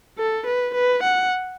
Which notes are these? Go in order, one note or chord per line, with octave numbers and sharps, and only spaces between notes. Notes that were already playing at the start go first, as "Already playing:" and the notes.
A4
B4
B4
F#5